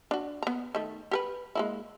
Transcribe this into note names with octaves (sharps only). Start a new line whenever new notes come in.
D4 F#4
B3 A#5
D#3 A3
G4 A#4 B4
G#3 A#3 E4